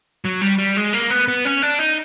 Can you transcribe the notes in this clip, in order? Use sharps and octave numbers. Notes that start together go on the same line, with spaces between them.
F#3
G3
G3
G#3
A#3
B3
B3
C#4
D4
D#4